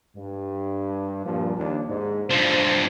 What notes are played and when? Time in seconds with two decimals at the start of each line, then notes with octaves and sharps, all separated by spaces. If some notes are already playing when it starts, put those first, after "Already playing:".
0.17 G2
1.26 G2 A#2 F3
1.58 D#2 D4
1.90 G#2
2.30 G2 F3 C5